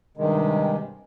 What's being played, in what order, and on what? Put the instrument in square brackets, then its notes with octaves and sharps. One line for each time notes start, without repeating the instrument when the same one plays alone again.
[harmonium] G2 C3 D#3 G#3